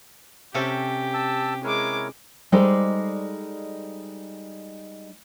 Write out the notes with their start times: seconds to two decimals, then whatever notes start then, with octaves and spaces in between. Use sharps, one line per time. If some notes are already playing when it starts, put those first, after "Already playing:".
0.54 C3 C#4 G4 A4
1.14 A5 E6
1.64 G#3 E4 A#4 C#5 D6
2.52 G3 G#3 D#4 A4 C5 D5